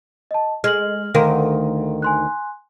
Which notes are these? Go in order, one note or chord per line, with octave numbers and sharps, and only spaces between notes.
D#5 A5
G#3 F6 F#7
D2 D#3 A#4 F5 C6
G#5 C6 F#6